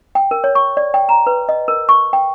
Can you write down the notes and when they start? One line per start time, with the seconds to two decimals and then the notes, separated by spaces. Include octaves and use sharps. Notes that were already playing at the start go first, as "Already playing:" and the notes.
0.15 G5
0.31 A#4
0.44 C#5
0.55 C#6
0.77 D5
0.94 G5
1.09 A#5
1.27 B4
1.49 D#5
1.68 A#4
1.89 C#6
2.13 G5